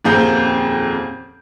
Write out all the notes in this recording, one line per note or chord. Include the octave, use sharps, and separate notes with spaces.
D#1 F2 A#3 C4 G#4 G6